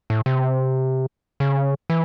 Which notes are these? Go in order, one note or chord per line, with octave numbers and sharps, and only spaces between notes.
A2
C3
C#3
E3